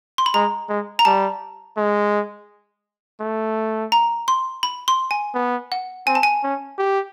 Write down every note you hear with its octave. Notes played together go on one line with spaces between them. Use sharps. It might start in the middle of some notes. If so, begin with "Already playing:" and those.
C6
B5
G#3 A#5
G#3
A#5
G3 A5
G#3
A3
A#5
C6
B5
C6
G#5
B3
F#5
C4 G#5
A5
G#5
C#4
G4